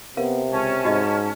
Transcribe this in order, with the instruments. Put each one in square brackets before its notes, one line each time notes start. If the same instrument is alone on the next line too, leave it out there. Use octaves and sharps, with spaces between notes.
[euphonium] C3 [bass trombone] B3 [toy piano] A#4 F5
[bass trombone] C#2 [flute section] C#4 A5
[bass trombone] G#2 [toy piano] F#4 D#5